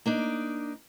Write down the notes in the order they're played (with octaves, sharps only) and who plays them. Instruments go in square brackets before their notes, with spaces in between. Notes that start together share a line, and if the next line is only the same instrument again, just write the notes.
[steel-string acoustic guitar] A#3 D4 D#4